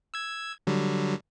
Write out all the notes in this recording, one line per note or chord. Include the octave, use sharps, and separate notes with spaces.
E6 G#6
D3 F#3 G3